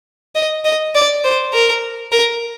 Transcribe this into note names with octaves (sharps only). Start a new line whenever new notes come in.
D#5
D#5
D5
C5
A#4
A#4